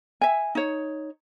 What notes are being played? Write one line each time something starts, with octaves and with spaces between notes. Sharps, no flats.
E5 G#5
D#4 C#5